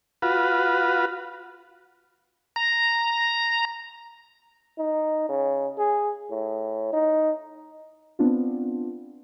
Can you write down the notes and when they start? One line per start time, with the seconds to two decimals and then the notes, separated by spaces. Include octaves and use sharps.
0.22 F4 F#4 B4
2.56 A#5
4.78 D#4
5.29 C#3
5.78 G#4
6.30 A2
6.93 D#4
8.19 B3 C4 D4 F4